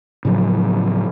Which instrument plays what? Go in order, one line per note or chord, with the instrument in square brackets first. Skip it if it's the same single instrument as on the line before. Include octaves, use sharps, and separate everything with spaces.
[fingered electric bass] A2 C#3 F3 F#3